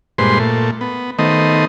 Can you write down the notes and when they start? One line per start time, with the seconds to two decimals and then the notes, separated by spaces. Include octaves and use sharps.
0.18 G2 A#2 G#3 B4 C5 C6
0.40 A#2 A3
0.81 B3
1.19 D#3 A3 B3 C5 D#5